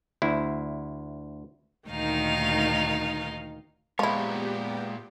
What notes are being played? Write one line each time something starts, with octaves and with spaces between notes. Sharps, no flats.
D2 E4
D2 A#2 D#3 D#4 F5
A#2 F3 G#3 B3 E4 G4 C#5